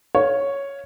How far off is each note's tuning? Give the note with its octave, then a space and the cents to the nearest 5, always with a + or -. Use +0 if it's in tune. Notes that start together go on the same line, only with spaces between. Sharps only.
C#5 +0 F5 +0